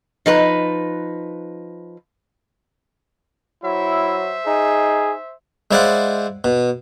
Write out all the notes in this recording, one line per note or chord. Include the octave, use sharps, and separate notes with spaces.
F3 D#4 B4
F#3 E4 C5 E5
D#4 G#4
G#3 E4 C5 D5 F5 F#5
B2